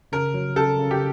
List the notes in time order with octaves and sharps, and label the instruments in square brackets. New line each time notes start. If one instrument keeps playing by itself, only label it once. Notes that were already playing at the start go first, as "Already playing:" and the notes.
[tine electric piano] C#3 [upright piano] A#4
[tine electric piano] F#3
[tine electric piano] C#3 [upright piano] A4
[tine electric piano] C#3
[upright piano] G4